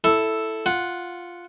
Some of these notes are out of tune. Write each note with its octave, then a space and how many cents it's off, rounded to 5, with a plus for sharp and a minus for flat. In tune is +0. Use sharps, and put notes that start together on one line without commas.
E4 +0 A4 +0
F4 +0 F#5 -5